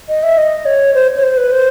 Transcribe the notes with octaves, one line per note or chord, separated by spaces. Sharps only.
D#5
E5
D#5
C#5
C5
C#5
C5
B4
C5